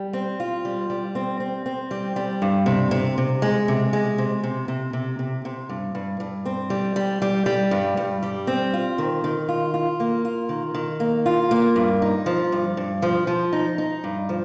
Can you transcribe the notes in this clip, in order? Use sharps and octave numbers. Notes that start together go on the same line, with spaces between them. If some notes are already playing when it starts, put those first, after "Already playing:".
Already playing: G3
C4
F4
G3
G3
C4
C4
C4
G3
G3
G2
C3
C3
C3
G#3
C3
G#3
C3
C3
C3
C3
C3
C3
G2
G2
G2
C4
G3
G3
G3
G3
G2
G2
G3
C4
F4
D#3
D#3
F4
F4
A#3
F4
D#3
D#3
A#3
F4
A#3
G2
D#4
F3
G2
G2
F3
F3
D#4
D#4
G2
F3